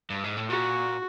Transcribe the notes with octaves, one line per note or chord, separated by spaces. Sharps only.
G2
G#2
A2
A#2 F#4